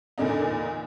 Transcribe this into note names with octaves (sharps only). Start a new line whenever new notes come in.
E2 A#2 D3 D4 D#4